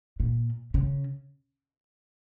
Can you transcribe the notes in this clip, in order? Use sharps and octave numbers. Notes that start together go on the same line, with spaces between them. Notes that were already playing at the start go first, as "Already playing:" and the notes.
A#2
C#3